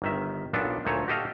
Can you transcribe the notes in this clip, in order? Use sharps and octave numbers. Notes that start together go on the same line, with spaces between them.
G1 D#3 E5
B1 A#2 B3 D4 A4
D2 A#2 D#4 A4 C#5
F#4 G4 A4 D#5 F5